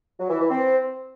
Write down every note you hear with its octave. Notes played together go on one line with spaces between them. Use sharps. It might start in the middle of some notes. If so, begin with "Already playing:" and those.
F#3
E3
E3
C4